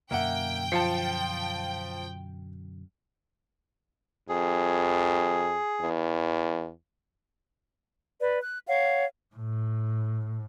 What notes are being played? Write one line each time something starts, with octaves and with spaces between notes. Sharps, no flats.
F#2 B2 D3 A#3 E5 F#5 G5
F3 F4 A5 C7 C#7
F2 G#4
E2
B4 D5
F#6
C#5 F5 F#5
A2